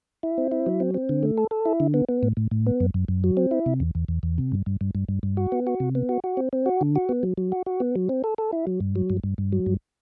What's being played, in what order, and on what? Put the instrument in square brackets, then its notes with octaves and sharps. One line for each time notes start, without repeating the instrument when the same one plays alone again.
[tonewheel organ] E4
C4
E4
F#3
C4
C4
D3
A3
A4
A4
E4
D3
B3
B3
A2
A2
A2
B3
F#2
F#2
F#2
F#3
C4
E4
C3
E2
E2
E2
E2
C3
G2
G2
G2
G2
G2
G2
F#4
B3
F#4
C3
B3
F#4
F#4
C4
C4
F#4
D3
F#4
B3
F#3
F#3
F#4
F#4
B3
F#3
C4
A4
A4
E4
F#3
G2
F#3
G2
G2
G2
F#3
G2